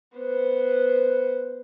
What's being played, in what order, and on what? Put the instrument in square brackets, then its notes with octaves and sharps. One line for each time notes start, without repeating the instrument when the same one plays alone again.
[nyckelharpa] B3 C5